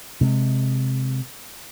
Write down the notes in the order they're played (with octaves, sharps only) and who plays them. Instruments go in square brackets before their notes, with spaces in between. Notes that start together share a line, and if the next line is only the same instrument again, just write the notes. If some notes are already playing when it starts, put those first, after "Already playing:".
[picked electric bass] C3 G#3